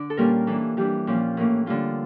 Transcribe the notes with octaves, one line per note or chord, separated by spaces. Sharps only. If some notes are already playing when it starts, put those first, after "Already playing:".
Already playing: D3 D4 D5
A4
A#2 G3 A#3 C#4 A#4
E3 A#3 D4 A4
E3 G3 D4 G4
A#2 F3 C#4
A2 E3 A#3 C#4
D3 G3 A#3 F4